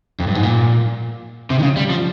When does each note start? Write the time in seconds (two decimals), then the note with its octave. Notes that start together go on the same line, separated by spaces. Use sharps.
0.19 F2
0.27 G2
0.35 G#2
0.43 A#2
1.50 C3
1.59 D#3
1.63 C#3
1.77 G3
1.90 F3